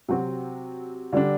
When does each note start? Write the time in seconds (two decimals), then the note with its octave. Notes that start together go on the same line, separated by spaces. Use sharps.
0.08 C3 F#3 C4 F#4
1.13 D3 G3 D4